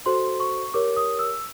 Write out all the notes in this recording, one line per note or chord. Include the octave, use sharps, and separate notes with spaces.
F#4 A4 C5 C6
C#6
G4 A#4 C#5 D6
D#6
E6